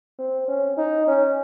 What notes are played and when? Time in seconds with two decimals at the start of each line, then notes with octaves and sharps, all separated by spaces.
0.19 C4
0.48 C#4
0.77 D#4
1.07 C#4